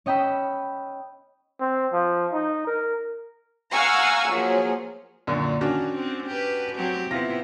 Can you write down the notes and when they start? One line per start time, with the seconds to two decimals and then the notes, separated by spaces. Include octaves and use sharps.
0.06 C#4 D#5 G5 B5 E6
1.60 C4
1.93 F3
2.32 D#4
2.67 A#4
3.72 F5 F#5 G#5 A#5 C#6 E6
4.30 F3 F#3 A#3 G#4
5.27 F#2 A#2 D3
5.61 D#3 C#4 D4 F#4
5.95 C4
6.27 G4 B4
6.76 F#3 C4 G4
7.11 C3 B3 E4 F4 A#6